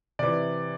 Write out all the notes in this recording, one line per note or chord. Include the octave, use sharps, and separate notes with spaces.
C3 E3 D5